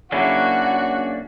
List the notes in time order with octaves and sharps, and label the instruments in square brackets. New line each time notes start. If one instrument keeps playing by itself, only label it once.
[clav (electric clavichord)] C#3 F#3 E4 [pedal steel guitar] A#3 C#4 D4 [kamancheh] F#4